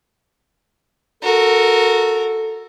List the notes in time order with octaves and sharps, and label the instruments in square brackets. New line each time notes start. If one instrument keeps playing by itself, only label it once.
[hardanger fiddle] F#4 A#4 [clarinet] A4